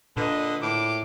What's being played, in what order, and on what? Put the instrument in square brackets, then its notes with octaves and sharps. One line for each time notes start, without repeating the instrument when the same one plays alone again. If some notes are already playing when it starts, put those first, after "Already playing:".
[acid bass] A#2 [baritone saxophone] D3 [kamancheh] B4 D#5
[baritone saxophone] A2 [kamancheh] D6